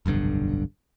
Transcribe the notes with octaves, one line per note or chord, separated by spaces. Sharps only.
F1 B1 G2 D3